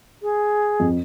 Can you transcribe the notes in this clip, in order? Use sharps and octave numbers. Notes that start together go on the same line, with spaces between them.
G#4
F2